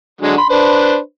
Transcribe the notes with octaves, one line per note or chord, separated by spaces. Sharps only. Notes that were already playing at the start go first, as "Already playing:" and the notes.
D3 F#3 G#3
B5 C6
D4 B4 C5